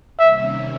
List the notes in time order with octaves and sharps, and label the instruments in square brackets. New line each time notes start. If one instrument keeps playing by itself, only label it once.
[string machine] C3 D#3 G3 A#3 C#4 [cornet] E5